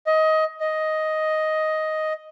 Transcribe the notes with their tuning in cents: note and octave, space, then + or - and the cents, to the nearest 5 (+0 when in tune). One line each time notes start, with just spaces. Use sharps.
D#5 +20
D#5 +5